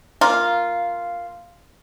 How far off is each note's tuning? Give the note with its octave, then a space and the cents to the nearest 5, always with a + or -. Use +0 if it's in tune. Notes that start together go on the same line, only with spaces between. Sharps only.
A#3 +0 F4 -5